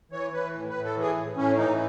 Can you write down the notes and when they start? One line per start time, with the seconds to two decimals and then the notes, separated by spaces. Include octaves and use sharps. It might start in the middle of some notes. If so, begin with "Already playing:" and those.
0.12 E3 C#5
0.33 E3 B4
0.54 A2
0.70 B4
0.75 A2
0.85 A4
0.96 E3 G#4
1.17 A2
1.37 A2 C#4
1.58 E3 D#4